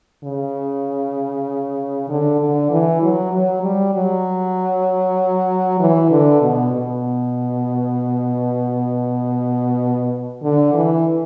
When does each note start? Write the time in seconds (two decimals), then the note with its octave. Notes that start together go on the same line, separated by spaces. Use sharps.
0.24 C#3
2.09 D3
2.40 D3
2.70 E3
3.02 F#3
3.32 F#3
3.63 G3
3.94 F#3
5.80 E3
6.11 D3
6.41 B2
6.72 B2
10.43 D3
10.74 E3